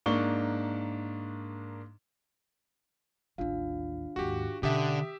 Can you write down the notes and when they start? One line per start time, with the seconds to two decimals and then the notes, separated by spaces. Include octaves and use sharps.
0.06 G#2 A#3 D4 C#6 G7
3.38 A1 D#2 D4 F4 F5
4.16 D#2 G#2 F#4 G4
4.63 B2 D3 C#4 G4 E5 D#6